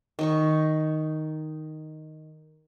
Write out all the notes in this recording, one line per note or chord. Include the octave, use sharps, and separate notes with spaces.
D#3 D#4 C#6